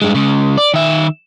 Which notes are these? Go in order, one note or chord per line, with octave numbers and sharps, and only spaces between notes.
G2 G#3
C#3 G#3
D5
D#3 E5